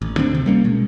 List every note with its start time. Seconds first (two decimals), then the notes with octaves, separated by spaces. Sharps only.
0.02 A1
0.16 D2 D3 C4 D4
0.35 C3
0.46 G3 A#3 C#4
0.64 B2 G#3